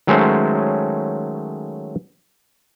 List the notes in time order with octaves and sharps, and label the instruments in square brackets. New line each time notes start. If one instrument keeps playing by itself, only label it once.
[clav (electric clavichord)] D#3 F#3 G#3 A3 C#4 C5